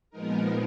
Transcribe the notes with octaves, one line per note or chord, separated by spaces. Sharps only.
A#2 F3 G#3 B3 D#4 A#4